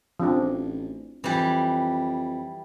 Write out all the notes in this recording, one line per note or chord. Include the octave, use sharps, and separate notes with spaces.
A1 F3 C4 D4
F2 E3 G3